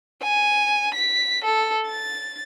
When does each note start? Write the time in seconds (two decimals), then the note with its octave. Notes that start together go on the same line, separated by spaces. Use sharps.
0.23 G#5
0.95 B6
1.45 A4
1.87 A6